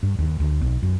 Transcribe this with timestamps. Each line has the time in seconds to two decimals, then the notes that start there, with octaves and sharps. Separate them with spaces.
0.03 G2
0.19 D#2
0.40 D2
0.61 B1
0.83 F#2